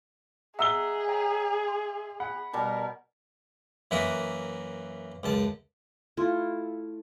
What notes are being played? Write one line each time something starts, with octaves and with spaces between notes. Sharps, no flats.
G#4 D#5 E5 F#5 A#5 E6 G7
C#5 G5 A#5
C6
F#5 B5
B2 G3 A#4
F#2 E3 A#3 F#4 E5 D#6
C#2 F#2 A5
A3 E4 F4